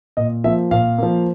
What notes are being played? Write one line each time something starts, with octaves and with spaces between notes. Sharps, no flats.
A#2 D#5
F3 A#3 E5
A#2 F5
F3 A#3